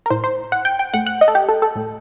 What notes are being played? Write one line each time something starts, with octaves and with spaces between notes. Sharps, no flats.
A#4
A2 C5
C5
F#5
G5
G5
A2 F#5
F#5
D#5
A4
G4
A4
A4
A2